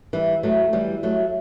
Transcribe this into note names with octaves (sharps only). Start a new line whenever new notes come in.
E3 G3
F#3 A3
E3 G3
F#3 A3